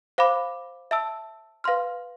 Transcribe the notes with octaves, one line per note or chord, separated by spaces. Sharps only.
C5 F5 B5 D6
E5 A5 E6
B4 F5 C6 F6